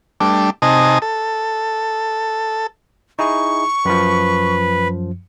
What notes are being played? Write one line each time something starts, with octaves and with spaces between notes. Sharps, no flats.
G3 A3 D4
C3 D#4 D#5 G#5 A5
A4
D#4 E4 G#4 C#6
F#2 F3 B4